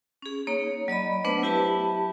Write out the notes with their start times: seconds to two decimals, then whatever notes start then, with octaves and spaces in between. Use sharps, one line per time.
0.22 C#4 G#4
0.47 A#3 D#4 C#5
0.88 F#3 D5 D#5 B5
1.25 A3 B3 D4 B4 C5 F#5
1.43 F#3 E4 G4 E5 A5 B5